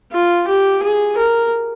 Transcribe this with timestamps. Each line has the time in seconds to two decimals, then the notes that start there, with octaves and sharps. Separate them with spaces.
0.12 F4
0.47 G4
0.83 G#4
1.18 A#4